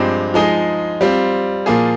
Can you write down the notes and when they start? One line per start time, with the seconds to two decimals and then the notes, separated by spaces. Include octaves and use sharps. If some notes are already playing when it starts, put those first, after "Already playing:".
Already playing: G2 F3 G#3 C4 G4
0.34 F3 G#3 D#4 G#4
1.01 G3 C4 F4
1.66 A#2 F3 A#3 F4 G#4